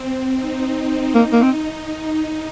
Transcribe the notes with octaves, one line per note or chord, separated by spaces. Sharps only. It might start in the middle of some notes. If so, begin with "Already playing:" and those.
Already playing: C4
D#4
A#3 D#4
A#3
C4